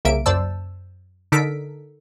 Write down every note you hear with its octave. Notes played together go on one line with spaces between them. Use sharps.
C2 C#3 A#3 E5 D7
F#2 C5 D5 A5 E6
D3 D#4 A4 A#4 B6 D7